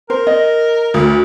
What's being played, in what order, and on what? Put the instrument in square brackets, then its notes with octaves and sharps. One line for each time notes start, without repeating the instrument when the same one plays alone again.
[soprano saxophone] A#4 [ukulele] C5
[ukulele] D#5
[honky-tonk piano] D2